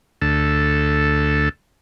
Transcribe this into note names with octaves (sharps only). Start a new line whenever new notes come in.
D2 A4